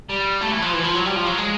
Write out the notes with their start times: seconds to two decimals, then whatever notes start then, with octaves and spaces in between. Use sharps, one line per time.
0.09 G3
0.41 A3
0.52 E3
0.62 F3
0.73 E3
0.84 F3
0.95 F#3
1.06 G3
1.16 F3
1.27 F#3
1.37 G#3